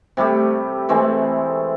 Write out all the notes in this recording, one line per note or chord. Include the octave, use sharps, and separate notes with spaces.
C3 G3 A3 G4
E3 G#3 A3 C4